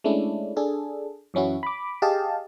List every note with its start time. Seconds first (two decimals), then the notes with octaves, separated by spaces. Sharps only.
0.04 G#3 A3 C#4 D4 E4
0.56 D4 G#4 A4
1.34 F#2 E3 C#4 E4 F#4
1.63 B5 D6
2.02 G4 G#4 D#5 F5 A5